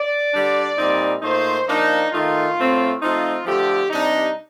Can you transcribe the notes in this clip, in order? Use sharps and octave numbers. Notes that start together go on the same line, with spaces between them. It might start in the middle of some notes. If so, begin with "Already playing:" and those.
Already playing: D5
D3 G3 D4
A#2 G3 C4 D#4
A#2 A3 D#4 C5
F3 A#3 D4 D#4
D#3 A3 D#4 F4
A2 A3 C4
F3 A3 C4 D#4 F4
D3 F3 A3 G4
C3 G3 D4 D#4